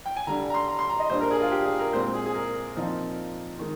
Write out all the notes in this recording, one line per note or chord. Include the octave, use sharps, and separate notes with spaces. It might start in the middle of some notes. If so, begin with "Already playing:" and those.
G5
G#5
D3 G3 D4 A#5
A#5
C6
A#5
C6
A#5
D#5
A#2 G3 D4 C5
A#4
G#4
F4
G4
G#4
A#4
A#2 G#3 C4 C5
G#4
G#4
A#4
A#2 F3 C4 D#4
D#3 G#3